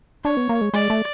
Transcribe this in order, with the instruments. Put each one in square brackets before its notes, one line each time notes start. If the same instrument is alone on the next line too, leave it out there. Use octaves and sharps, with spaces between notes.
[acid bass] D4 [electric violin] C#5
[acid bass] B3
A#3
G#3
[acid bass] G#3 [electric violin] D5
[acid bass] A3